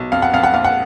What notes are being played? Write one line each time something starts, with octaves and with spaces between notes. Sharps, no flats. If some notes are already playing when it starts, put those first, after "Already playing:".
Already playing: B1
F2 F5
F#5
F2 F5
F#5
A#1 F5
F#5